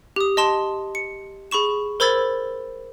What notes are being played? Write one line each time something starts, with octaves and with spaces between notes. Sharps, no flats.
G4 D#6
D#5 A5 C6 E7
C#7
G#4 B5 C#6 E7
A#4 C5 B5 E6 G#6 A6